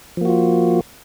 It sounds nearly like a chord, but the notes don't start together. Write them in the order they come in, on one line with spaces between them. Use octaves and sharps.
F3 A#3 F#4 F4